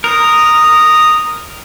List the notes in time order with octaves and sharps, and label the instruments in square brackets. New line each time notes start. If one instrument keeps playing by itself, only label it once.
[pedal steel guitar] A#4 [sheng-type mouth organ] A#5 D#6